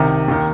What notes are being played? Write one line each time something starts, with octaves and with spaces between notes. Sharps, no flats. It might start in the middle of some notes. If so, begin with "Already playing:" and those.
Already playing: C2 C3 D#3
D#2 D#3